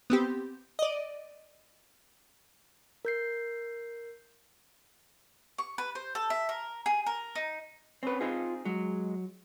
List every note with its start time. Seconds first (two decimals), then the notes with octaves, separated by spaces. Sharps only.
0.10 B3 C4 G4
0.79 D5 D#5
3.05 A#4 G6 C7
5.58 C#6
5.78 B4
5.95 C5
6.15 A4
6.30 E5
6.49 A#4
6.86 G#4
7.06 A#4
7.35 D#4
8.03 C4 C#4 B4
8.21 C4 D#4 F4 G#4
8.65 F#3 G#3